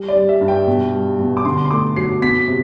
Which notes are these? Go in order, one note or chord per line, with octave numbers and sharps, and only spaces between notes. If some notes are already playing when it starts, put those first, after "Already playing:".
Already playing: G3
D5
G3
E5
G2
G5
B2
G3
B2
D6
D3 C6
C6
A3 D6
F#3 C7
B3 B6
C3